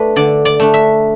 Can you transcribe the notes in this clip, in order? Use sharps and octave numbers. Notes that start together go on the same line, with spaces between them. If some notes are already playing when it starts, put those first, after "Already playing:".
Already playing: A3 D4 B4
D3 D5
D5
A3 D4
E5